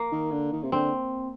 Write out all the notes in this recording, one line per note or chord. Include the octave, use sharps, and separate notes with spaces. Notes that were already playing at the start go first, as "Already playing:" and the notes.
Already playing: A#3
D#3
D3
D#3
C3
D3 C4